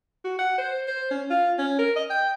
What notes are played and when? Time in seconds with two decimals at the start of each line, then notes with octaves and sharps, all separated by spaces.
0.24 F#4
0.39 F#5
0.58 C5
0.88 C5
1.11 C#4
1.30 F4
1.58 C#4
1.79 A#4
1.96 D#5
2.10 G5